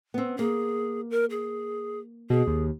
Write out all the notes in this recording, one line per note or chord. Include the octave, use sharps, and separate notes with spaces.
B3 C4
A#3 G#4
A#4
G#4
B2 G#4
D#2